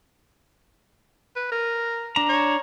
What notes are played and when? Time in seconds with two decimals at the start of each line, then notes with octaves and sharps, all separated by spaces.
1.36 B4
1.52 A#4
2.16 D4 A#5
2.29 C#5